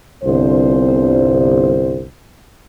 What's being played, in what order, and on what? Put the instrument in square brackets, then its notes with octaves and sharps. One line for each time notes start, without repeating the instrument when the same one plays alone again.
[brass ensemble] G1 C2 C5